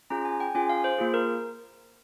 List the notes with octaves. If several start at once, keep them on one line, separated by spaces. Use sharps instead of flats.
C#4 F4 G#4 A#5
G#5
G5
C#4 F4 G#4 G#5
F5
C5
A#3 F4 G#4
A#4